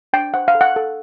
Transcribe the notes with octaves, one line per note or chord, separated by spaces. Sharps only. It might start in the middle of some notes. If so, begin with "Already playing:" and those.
D4 G5
C5 F#5
F5
A4
F#5
A4